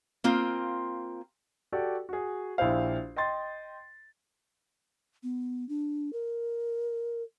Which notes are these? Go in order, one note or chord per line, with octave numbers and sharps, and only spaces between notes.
A#3 C4 F4
F#4 G4 A4 D5
F#4 G#4
A#1 E4 G4 C5 F5
D#5 G5 C6 A6
B3
D4
A#4